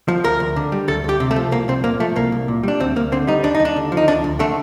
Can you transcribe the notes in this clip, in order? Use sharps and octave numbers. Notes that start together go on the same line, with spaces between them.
F3
D2 A#4
D2
D3
G3
D2 A4
D2 G4
C3
A3
F3
C2 A#3
C2 C4
A#2 A#3
F3 A3
C2 A#3
C2
A#2
G3 D4
D2 C4
D2 A#3
D3 C4
G3 D#4
D#2 D4
D#4
D#2
D4
D3
F3
D#4
D2 D4
D2
D3 A3